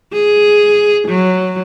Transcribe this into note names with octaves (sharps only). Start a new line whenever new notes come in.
G#4
F#3